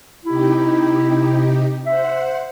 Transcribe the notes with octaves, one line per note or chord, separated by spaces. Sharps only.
C3 D#4 E4 G4
C5 E5 F#5